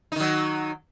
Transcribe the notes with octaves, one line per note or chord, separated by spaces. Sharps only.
D#3 F#3 D#4